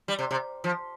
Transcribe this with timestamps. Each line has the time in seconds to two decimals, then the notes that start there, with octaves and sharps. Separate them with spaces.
0.08 G3
0.19 C3
0.31 C3
0.64 F3